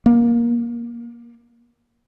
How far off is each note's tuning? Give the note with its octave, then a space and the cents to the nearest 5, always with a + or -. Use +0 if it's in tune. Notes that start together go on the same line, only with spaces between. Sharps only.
A#3 +20